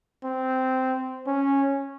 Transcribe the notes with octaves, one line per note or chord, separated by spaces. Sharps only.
C4
C#4